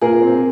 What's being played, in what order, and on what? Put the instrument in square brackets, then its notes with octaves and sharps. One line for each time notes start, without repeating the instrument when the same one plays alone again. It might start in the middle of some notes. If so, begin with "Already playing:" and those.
[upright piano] A#2 G#4 A#4
C4